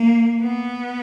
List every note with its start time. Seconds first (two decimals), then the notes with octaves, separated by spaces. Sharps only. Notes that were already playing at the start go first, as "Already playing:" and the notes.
Already playing: A#3
0.41 B3